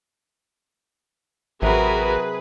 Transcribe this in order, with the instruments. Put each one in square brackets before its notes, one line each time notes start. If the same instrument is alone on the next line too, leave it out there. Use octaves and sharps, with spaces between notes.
[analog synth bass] A1 [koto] C3 F#3 [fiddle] F#4 A#4 [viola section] G#4 B4